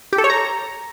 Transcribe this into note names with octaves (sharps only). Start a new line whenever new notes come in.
G4
A4
C#5
A#5